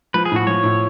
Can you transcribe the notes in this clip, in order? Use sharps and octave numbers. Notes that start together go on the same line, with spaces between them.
F3 B4
G#4
A2 F#4
F3 C#5
A2